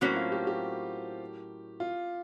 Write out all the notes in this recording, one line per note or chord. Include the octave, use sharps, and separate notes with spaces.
A2 F#3 A#3 C4 C#4 F#4
F4
G4
G4
F4